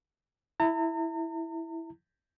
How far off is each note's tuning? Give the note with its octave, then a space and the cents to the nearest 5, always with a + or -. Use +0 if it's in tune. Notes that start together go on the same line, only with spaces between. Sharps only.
E4 +0 A#5 -45